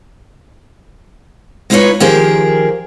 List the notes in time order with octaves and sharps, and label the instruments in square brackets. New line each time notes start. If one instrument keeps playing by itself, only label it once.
[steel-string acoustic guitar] G#3 B3 D#4 F4 B4 C#5
D#3 F3 G4 G#4 A#4 C5